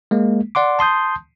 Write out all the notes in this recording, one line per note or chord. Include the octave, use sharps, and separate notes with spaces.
G#3 A#3
D5 F#5 C6 D6
A5 C6 D#6 G6